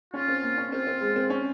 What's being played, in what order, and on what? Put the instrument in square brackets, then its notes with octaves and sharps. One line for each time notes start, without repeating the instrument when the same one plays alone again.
[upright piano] C#4 [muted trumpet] F4
[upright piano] C4
A#3
C#4
[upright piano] C4 [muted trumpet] F4
[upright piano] C4
G#3
C4
C#4